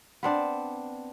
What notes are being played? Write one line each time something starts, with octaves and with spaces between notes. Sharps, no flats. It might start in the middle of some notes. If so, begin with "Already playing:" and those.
B3 C4 D4